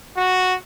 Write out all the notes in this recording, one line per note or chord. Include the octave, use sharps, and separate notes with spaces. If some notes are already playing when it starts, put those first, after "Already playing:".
F#4